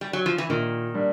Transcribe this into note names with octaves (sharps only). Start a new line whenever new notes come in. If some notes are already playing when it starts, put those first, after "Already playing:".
G3
F#3
F3
E3
A#2 D#3
G3 A#3 D4